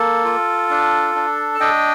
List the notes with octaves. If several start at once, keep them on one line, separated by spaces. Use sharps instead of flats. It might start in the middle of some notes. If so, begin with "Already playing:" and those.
Already playing: A#3 A4
F4
D4
D4
A5
D4 D#5 G5